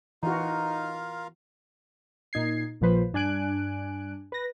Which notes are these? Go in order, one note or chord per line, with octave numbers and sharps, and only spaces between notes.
E3 D#4 F4 F#4 A#4 F5
A#2 D#4 G#6 C7
A#1 A#2 F3 B4 C5
G2 D4 G#5 F#6 D7
B4 A#6